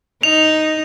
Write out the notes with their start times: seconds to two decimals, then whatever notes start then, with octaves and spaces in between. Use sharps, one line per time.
0.23 D#4 F7